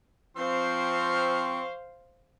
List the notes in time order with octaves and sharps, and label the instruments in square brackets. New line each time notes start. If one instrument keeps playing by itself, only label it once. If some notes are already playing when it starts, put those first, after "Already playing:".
[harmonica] F3 C#6 F6 [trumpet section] C4 [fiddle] C5 F5